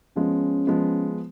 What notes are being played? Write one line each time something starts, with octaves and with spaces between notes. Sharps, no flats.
F3 G#3 B3 C#4
F3 G#3 B3